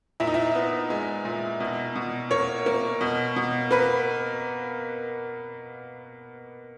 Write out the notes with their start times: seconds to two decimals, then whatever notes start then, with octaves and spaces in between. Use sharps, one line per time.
0.20 A#2 E4
0.27 D#4
0.34 E4
0.55 B3
0.90 G#3
1.25 A#2
1.60 B2
1.96 B2
2.31 A#3 C#5
2.66 A#3
3.01 B2
3.36 B2
3.71 A#3 B4